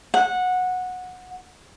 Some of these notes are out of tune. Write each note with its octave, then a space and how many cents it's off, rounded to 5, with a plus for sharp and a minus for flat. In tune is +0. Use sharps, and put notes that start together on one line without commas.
F#5 -15